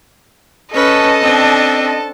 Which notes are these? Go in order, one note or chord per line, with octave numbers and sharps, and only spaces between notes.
C#4 A4 B4 D#5 A5
C4 D4